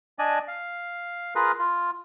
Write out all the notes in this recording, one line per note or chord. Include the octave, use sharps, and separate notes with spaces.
D4 D5 D#5 G#5
F5
F4 G#4 A#4 B4
F4